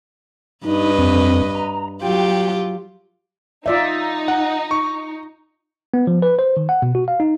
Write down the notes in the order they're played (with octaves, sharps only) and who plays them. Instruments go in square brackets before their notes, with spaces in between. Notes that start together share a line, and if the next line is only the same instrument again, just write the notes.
[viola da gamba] G2 B4 D#5 [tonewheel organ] D#4
[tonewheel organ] F2 C4
A#5
[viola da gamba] F#3 F4 G4 [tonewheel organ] G5
[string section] D#4 [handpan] F4 D5 E5
[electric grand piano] F#5
C#6
[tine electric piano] B3
F3
B4
C5
D#3
F#5
B2
F#4
F5
D#4